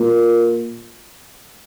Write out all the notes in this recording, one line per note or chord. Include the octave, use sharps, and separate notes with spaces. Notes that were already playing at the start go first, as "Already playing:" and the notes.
Already playing: A#2